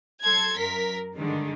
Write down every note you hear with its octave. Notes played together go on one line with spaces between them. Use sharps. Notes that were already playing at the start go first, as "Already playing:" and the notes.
F#3 A4 C6 G#6
F#2 A#4 B6
G2 D3 D#3 G#3